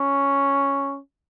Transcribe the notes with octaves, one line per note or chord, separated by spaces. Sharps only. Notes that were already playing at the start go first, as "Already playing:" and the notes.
Already playing: C#4